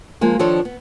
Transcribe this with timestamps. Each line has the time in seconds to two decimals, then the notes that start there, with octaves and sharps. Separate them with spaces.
0.21 F3 G#3 A#3 F4
0.39 D#3 F3 D4 A4 C5 C#5
0.65 B3